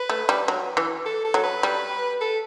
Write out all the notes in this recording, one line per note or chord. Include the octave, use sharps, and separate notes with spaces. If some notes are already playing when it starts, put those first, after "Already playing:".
Already playing: B4
A3
G3
F#3
E3
A4
A4
F#3
B4
G3
A4